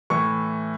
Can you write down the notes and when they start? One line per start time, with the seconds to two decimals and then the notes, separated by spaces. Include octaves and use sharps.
0.10 A2 E3 C#6